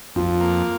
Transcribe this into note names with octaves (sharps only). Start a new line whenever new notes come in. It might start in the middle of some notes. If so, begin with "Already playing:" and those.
F2 F4
A#3